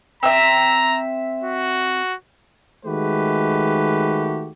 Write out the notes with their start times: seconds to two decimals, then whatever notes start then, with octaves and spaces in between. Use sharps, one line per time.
0.23 C4 E5 A#5
1.43 F#4
2.86 D#3 G#3 A3 F#4 G4 B4